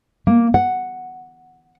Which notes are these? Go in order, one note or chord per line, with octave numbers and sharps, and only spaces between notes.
A#3
F#5